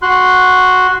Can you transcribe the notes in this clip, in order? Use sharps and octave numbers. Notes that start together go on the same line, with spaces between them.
F#4 C6 F#6